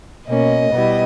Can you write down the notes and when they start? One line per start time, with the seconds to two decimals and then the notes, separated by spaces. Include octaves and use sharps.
0.28 B2 A#3 C#4 D#5
0.71 B2 G3 B3 E4